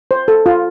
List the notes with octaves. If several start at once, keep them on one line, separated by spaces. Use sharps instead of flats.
C5
A4
F4